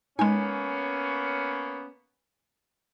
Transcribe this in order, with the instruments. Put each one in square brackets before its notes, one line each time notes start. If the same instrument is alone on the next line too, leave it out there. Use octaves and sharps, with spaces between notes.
[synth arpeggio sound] G#3 D#4 [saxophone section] A#3 B3 C#4 [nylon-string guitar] G#5